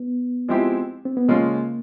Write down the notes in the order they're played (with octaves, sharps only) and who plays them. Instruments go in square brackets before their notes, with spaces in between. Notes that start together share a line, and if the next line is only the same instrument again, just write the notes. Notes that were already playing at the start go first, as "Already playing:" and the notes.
Already playing: [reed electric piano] B3
[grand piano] F3 G#3 C4 E4 G4
[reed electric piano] C4
B3
[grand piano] C#3 F3 G#3 C#4 F4 [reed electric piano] A#3